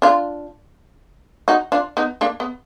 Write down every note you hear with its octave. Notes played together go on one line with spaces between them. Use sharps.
D4 F4
D#4 F#4
D4 F4
B3 D#4
A#3 D4
B3